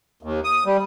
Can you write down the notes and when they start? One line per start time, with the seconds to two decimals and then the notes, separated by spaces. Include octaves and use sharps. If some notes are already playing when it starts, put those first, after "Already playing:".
0.23 D#2
0.44 D#6
0.66 G3